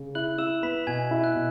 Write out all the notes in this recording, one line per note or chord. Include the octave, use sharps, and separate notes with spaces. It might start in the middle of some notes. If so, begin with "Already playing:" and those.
Already playing: C#3
E4 F#6 F#7
E4 E6 E7
B3 B5 B6
B2 G#5 G#6
E4
F#6
B2